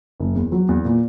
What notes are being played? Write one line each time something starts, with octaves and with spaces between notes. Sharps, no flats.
F#1
E2
F#3
E2
A#2